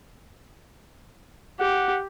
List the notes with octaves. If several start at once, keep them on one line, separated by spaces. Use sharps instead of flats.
G4 F#5